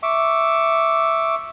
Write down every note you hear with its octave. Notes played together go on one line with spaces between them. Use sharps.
E5 C#6 D6